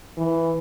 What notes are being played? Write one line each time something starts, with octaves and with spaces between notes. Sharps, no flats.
E3